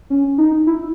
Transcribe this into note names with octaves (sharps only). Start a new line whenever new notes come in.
C#4
D#4
E4